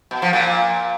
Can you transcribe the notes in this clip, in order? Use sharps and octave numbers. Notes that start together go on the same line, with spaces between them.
B2
F3
A#2